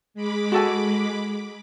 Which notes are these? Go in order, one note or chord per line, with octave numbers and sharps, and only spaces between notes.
G#3 B5 D6
F#4 A4 G#5